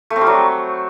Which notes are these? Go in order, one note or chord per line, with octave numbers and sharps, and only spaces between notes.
A3
C4
G3
F#3